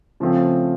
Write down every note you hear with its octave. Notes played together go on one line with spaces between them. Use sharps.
C#3 F3 A3 C4 F4